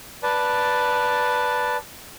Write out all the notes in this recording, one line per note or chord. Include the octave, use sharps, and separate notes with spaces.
B4 D5 A5